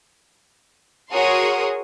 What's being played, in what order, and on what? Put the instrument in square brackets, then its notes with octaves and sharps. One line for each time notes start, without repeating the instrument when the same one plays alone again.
[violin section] F#4 G#4 A#4 C#5 C6 D#6